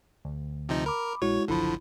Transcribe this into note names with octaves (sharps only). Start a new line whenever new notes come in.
D2
C3 F3 D#4
A#4 B5 D6
A#1 G#3 E4 F#4 C#5
F#1 B1 D3 F3 E4 B5